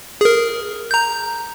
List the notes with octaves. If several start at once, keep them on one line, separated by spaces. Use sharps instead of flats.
G#4 A#4
A#5 G6